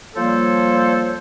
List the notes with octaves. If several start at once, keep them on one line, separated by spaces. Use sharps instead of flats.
F3 G3 A#3 A4 C5 C#5